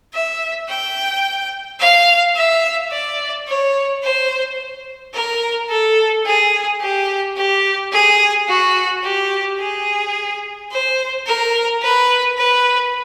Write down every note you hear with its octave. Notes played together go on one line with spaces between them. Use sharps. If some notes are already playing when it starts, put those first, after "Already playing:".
E5
G5
F5
E5
D5
C#5
C5
A#4
A4
G#4
G4
G4
G#4
F#4
G4
G#4
C5
A#4
B4
B4